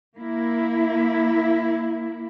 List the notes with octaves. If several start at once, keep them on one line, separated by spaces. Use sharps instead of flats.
A#3 E4